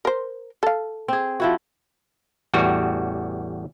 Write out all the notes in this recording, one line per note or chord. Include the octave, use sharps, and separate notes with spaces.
A#4 C5
A4 F5
C4 G#4
F3 E4 F#4
A1 E2 G3 F#4